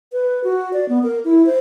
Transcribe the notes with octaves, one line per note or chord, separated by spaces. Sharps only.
B4
F#4
D5
B3
A#4
E4
C5